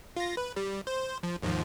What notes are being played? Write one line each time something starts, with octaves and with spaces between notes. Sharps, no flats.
F4 A#6
B4
G3
C5
F3
D#2 G#2 F3